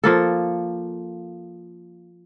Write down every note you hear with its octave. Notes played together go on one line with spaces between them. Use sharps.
F3 A#3 A4